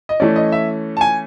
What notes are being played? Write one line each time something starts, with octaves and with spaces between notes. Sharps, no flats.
D#5
E3 A3 C#4 D5
D#5
E5
A5
G#5